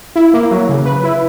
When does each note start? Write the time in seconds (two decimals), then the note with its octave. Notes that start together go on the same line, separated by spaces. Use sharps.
0.16 E4
0.34 A#3
0.51 F#3
0.69 C#3
0.86 B4
1.03 E4